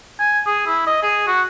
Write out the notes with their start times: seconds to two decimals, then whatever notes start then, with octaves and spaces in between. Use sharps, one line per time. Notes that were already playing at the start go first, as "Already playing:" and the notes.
0.20 G#5
0.46 G#4
0.67 E4
0.87 D#5
1.03 G#4
1.27 F#4